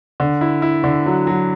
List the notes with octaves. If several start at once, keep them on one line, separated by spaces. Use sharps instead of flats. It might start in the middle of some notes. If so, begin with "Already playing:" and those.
D3
E4
E4
D3
F#3
F#3